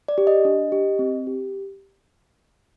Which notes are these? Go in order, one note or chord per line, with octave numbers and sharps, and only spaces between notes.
D5
G4
D#5
D4
G4
C4
G4